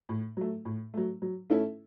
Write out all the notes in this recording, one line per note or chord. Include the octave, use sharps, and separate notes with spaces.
A2
F#3 A3
A2
F#3 A3
F#3
A3 C#4 E4 A4